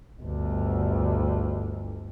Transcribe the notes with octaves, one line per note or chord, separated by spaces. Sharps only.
G1 D2